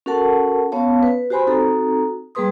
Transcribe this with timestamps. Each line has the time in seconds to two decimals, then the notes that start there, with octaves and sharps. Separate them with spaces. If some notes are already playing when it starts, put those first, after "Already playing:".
0.06 C#4 F#4 A4 A#4 F#5 A5
0.72 B3 C#4 C#5 F5 A5
1.03 B4
1.30 F#4 G4 C5 G#5 B5 C6
1.47 C4 D#4 F#4 A4 A#5
2.35 G3 A#3 G#4 B4 C6 D#6